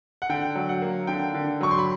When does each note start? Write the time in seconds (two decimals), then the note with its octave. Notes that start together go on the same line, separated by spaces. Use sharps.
0.22 F#5
0.29 D3 G5
0.55 F#3
0.69 F#5
0.82 A#3
1.07 D3 G5
1.34 D3
1.61 F#3 C#6
1.71 C6
1.79 B5